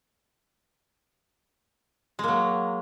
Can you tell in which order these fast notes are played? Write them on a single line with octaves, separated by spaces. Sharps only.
G#3 A#3 F#3